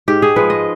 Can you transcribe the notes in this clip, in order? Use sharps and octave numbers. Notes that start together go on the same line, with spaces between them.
G#2 G4
G#4
F3 G#3 B4
D#5